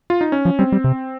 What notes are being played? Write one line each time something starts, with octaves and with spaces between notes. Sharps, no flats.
F4
D#4
C#4
F3
G3 C4
G3
C3